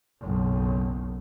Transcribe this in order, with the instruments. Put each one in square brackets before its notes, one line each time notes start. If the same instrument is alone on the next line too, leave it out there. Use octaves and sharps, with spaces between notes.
[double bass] F#1 B1